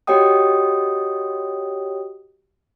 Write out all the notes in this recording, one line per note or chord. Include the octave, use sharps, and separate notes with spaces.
F#4 G4 C#5 D#5 G5 D#6